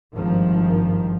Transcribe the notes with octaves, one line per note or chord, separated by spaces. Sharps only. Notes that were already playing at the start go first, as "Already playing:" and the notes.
G#1 G2 D#3 F3